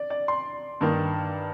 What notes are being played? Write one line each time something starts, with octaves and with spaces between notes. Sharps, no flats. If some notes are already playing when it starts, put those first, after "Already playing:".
Already playing: D5
D5
C6
G2 D#3 A#3